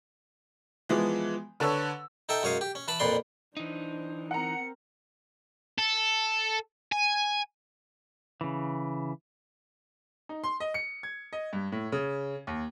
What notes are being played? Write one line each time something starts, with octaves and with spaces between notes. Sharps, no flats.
E3 F3 G#3 B3
D3 A4 B4 C#5 E6
D#4 A4 E5 G5
F#2 G#3 C#5 F5 D#6
G4
C#4
E3 B4 A5 B5
F2 A#2 B4 D5 C6
E3 D4 D#4 C5
C4 A#4 F#5 A#5 C#7
A4
G#5
C#3 E3
D#4
C6
D#5
C#7
G#6
D#5
G2
A2
C#3
D#2